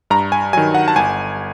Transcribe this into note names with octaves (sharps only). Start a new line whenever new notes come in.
G2 A#5
G#5
D#3 F#3 G#5
F#5
A5
G1 G#5